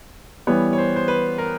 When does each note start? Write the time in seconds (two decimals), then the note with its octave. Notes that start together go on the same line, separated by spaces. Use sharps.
0.47 E3 G3 B3 C#5
0.73 C#5
0.78 C5
0.96 C5
1.08 B4
1.38 A#4